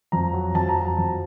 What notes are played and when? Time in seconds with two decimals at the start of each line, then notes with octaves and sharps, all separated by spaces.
0.12 F2 A#5
0.33 F#3
0.55 F2 A5
0.69 A#5
0.77 F#3 A5
0.98 F2